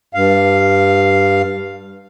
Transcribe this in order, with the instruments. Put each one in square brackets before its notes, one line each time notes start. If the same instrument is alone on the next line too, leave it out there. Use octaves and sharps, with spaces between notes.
[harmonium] G2 F5